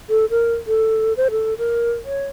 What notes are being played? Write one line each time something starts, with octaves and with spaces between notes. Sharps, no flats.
A4
A#4
A4
C5
A4
A#4
C#5